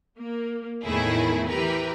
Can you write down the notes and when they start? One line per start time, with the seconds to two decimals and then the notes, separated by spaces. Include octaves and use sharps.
0.19 A#3
0.85 E2 A2 D#3 A3 E4 G#4
1.48 E3 G4 A#4 B4